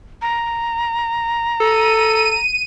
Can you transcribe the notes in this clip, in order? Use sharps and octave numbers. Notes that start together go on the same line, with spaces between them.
A#5
A4 D#7